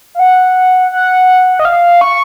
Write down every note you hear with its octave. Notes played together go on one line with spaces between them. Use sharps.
F5
F#5
F#5
D#5
F5
C#6